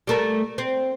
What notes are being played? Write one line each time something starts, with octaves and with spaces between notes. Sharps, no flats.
G3 A3 A#4
C4